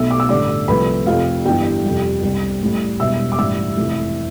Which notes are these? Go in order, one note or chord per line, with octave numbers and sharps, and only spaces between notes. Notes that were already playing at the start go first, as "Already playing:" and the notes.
Already playing: B1 B2 A3 E5 E6
D6
E6
A1 G2 D3 G3 D5 D6
C2 C3 F3 A3 B4 B5
F1 F2 C3 F4 F5
G1 G2 E3 G4 G5
F2 C3 G3
C2 C3 G3
A1 A2 G3
E1 E2 B2 G3 E5 E6
D6
A1 G2 E3 G3 E5 E6
F1 F2 C3 E3